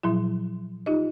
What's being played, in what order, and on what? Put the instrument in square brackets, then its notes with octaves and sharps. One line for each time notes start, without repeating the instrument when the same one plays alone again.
[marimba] A#2 F3 F#3 E4
D#4 F4 G4 D#5